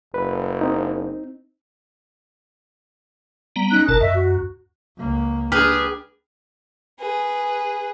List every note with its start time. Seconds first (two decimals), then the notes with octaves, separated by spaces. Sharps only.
0.14 F#1 B4
0.61 C4 D#4
3.56 G3 B3 A#5
3.71 C#4 D#4 F#6
3.88 G1 B2 A#4 A5
4.01 F#2 D#5 E5
4.14 F#4
4.97 C#2 A#3
5.52 D4 G4 G#4 B4 F6
7.00 G#4 B4